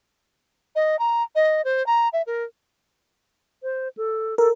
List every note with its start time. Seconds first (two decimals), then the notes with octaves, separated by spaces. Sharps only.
0.76 D#5
0.99 A#5
1.35 D#5
1.65 C5
1.87 A#5
2.13 E5
2.27 A#4
3.63 C5
3.97 A4
4.38 A4 A#4